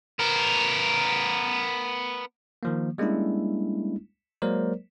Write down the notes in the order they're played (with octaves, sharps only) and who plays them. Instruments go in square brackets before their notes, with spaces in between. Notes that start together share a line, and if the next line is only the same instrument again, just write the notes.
[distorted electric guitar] B3 A#4
[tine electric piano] D#3 F3 A#3
G3 G#3 A#3 C#4 D4 E4
F#3 G#3 A#3 A#4 C5 D5